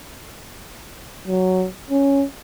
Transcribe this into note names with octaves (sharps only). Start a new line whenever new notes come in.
F#3
C#4